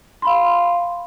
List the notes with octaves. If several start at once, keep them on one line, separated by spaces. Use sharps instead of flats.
F5 B5 C6